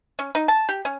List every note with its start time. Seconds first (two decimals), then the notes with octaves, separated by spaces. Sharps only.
0.19 C#4
0.35 D#4
0.48 A5
0.69 G4
0.85 C#4